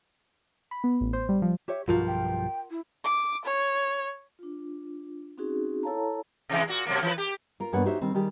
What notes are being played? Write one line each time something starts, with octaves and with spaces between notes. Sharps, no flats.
B5
B3
A1
C5
G3
F3
G4 C#5 E5
B1 G2 F3 F4 F#4 A#4
G5
E4
D6
C#5
D4 F4
C4 C#4 D#4 F#4 G#4
E4 A4 C#5 F5 A5 A#5
C3 E3 G#3
A#2 F#4
B2 F#3 A#3
E3 B4
G4
F4 A#4
G2 E3 A#3 B3 C#5 F#5
D#4 F#4 G4 C5 C#5 E5
D#3 G3 C4
D#3 G3 G4 G#4